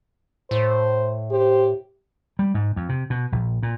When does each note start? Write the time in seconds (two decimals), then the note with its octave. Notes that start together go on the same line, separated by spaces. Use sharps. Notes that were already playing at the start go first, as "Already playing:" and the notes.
0.51 A2 C5
1.31 G4 C5
2.39 G3
2.54 G#2
2.76 F2
2.89 C3
3.10 B2
3.32 A#1
3.63 A#2